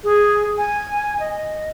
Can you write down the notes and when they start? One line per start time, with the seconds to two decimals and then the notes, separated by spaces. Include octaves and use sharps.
0.04 G#4
0.57 G#5
1.20 D#5